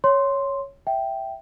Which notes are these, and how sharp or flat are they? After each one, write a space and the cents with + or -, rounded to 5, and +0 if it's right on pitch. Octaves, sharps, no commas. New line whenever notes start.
C#5 +0 C6 +0
E5 +0 G5 -5